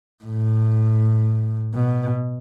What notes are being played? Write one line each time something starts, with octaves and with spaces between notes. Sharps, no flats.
A2
B2